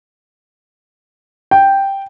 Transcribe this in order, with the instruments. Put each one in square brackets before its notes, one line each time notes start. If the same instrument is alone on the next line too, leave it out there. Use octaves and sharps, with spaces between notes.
[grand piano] G5